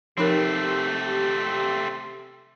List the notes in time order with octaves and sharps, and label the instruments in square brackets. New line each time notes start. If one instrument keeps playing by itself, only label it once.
[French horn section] C3 G4 [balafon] F3 D#4 A#4 [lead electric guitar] A3 C4